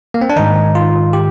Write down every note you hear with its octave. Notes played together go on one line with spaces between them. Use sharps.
A#3
C4
D4
G#2 D#3 D#4
F4
G4